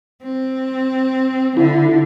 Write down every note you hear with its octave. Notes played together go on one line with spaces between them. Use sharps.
C4
D3 E4